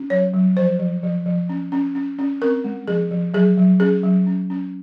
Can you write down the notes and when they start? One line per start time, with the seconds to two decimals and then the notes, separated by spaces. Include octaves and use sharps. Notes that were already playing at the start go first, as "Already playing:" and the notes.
Already playing: C#4
0.10 F#3 C#5
0.33 F#3
0.57 F3 C5
0.79 F3
1.03 F3
1.26 F3
1.49 C#4
1.72 C#4
1.95 C#4
2.19 C#4
2.42 C4 A#4
2.64 G#3
2.88 F3 G#4
3.11 F3
3.34 F#3 G#4
3.58 F#3
3.80 C#4 G#4
4.03 F#3
4.27 C#4
4.50 C#4